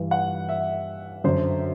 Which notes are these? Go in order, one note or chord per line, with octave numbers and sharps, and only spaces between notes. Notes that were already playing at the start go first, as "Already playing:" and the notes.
Already playing: G2 E3
F#5
E5
F#2 D3 C5